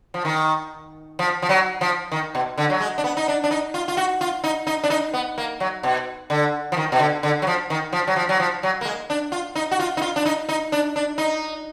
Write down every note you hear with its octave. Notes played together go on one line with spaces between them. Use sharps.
F3
D#3
F3
F3
F#3
F3
D#3
B2
D3
F#3
G#3
D4
B3
D#4
D4
D4
D#4
F4
F4
F#4
F4
D#4
D#4
D4
D#4
B3
A#3
F#3
B2
D3
F3
D#3
B2
D3
D3
F#3
F3
D#3
F3
F#3
F3
F#3
F3
F#3
A#3
G#3
D4
F4
D#4
F#4
F4
D#4
F4
D4
D#4
D#4
D4
D4
D#4